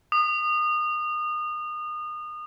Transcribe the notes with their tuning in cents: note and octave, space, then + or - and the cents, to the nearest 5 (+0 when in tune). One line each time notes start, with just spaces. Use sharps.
D#6 -30